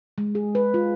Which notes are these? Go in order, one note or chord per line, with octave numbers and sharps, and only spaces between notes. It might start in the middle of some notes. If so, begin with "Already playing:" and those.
G#3
G#4
B4
F4